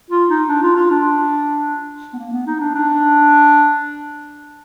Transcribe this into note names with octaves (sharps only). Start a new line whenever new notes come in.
F4
D#4
D4
F4
F4
D4
B3
A#3
B3
D#4
D4
D4